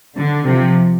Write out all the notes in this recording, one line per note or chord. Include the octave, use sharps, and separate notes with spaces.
D3
C3 F3